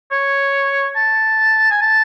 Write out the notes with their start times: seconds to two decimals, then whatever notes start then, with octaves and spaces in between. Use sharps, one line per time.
0.11 C#5
0.96 A5
1.71 G#5
1.81 A5